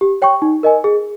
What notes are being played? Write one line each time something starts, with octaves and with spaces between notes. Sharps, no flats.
G4
C#5 G5 C#6
D#4
A#4 D#5 G#5
G#4